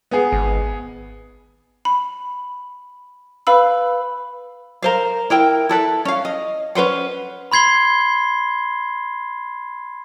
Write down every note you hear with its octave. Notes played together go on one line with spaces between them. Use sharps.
B3 G#4
G#1
B5
B4 F5 B5 E6
A#4 C5 F5
E4 A#4 G5
E4 A4 B4
C#4 F5
D#5
C#4 B4 C5 F#5
B5 C6 G#6 C7 G7